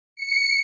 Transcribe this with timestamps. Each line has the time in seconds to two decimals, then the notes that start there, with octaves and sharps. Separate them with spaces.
0.16 C#7